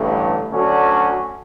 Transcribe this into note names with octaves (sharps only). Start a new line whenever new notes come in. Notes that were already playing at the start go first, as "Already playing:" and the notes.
Already playing: A1 G2 D3 A3
D2 D3 F#3 C#4 F#4